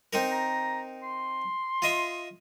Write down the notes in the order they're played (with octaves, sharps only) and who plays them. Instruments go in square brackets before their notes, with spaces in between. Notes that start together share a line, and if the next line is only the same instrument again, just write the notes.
[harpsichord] C4 D#4 A#4
[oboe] A#5
C6
[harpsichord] F4 D#5 E5